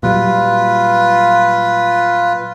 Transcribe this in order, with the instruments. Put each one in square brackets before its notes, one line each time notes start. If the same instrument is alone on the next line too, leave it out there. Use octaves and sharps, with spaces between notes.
[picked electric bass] A#2 F#3 G3 [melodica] F4 B4